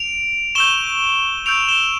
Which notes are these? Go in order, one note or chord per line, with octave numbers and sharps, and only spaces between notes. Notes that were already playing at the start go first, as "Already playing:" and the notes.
Already playing: D7 F7
C#6 E6 G6 E7 G7
C#6 E6 G6 D7 F7
E7 G7